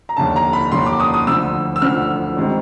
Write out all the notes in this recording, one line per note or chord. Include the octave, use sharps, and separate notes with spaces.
A#5
F1 D#2 D3 A5
A#5
B5
F1 D#2 D3 C6
D6
D#6
D#6
D2 D3 F3 E6
E6
D2 D3 F3 F6
G#1 D#3 G3 C4